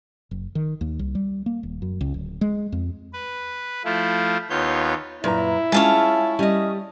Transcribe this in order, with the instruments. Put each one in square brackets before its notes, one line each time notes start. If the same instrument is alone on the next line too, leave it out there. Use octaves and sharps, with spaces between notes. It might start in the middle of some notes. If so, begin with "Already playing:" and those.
[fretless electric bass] F#1
D#3
D#2
C2
G3
A#3
D#1
F#2
C#2
D1
G#3
F2
[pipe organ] B4
F3 A3 E4 F4
D#2 B3 F4 C#5 G6
[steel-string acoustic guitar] F#2 B4 A#5 [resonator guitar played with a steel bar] A#2 [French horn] E4
[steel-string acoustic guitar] G#3 [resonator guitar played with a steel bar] C#4 F4 G#4 [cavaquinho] C#5 E5 A5
[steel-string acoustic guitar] G3 [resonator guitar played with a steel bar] C#4 D#5